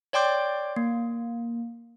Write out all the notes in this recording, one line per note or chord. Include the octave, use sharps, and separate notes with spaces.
C#5 D5 G5 C6 D6 G6
A#3